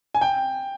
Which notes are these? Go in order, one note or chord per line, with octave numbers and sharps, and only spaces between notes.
G#5
G5